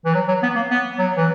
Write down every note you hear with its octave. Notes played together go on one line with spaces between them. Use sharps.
E3
F#3
F#3
B3
A#3
B3
F#3
E3